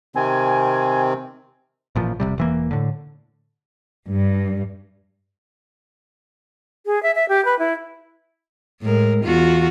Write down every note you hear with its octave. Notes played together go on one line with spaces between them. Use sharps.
C3 D#3 C4 G#5
A1 A#2 F3
F1 C#2 C3 G3
E1 E3 A#3
A2 D3
G2
G#4
E5
E5
G4
B4
E4
A2 G#3 A#4
E2 F4 F#4